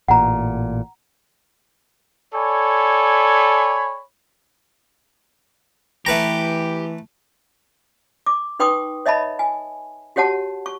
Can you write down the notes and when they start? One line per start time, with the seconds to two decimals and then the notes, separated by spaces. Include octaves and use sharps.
0.08 A1 A#2 F#5 A#5
2.34 A4 C#5 D5 G#5 B5
6.06 E3 A3 G4 B4 A#5
8.26 D6
8.59 D#4 B4 G5 C6 C#6 D#6
9.06 C#5 D#5 E5 A5 B5
9.39 G#5
10.16 F#4 G4 C#5 F#5 A5
10.66 C#6